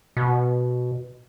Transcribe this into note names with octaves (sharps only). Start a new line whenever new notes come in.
B2